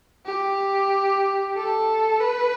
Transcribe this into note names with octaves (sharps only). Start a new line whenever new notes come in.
G4
A4
B4